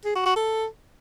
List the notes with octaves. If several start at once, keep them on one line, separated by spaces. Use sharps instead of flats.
G#4
F#4
F#4
A4